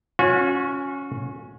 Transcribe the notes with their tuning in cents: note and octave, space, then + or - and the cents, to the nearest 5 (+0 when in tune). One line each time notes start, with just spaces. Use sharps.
C#4 +0 F#4 -35